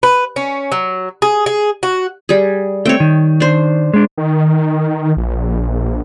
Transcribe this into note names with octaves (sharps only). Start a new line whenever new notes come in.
B4
C#4
F#3
G#4
G#4
F#4
G3 G#4
A3 C4 C#5 G5
D#3
D4 C5
G#3 D4
D#3
A#1